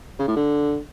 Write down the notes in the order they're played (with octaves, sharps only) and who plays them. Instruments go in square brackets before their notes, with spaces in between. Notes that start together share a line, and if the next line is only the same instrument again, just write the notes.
[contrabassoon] C#3
A2
D3